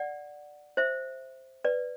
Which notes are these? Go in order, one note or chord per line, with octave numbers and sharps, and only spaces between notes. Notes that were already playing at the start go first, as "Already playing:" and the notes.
Already playing: D5 F#5
C5 E5
B4 D5